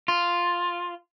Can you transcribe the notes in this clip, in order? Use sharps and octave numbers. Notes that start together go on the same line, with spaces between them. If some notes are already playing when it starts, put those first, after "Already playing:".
F4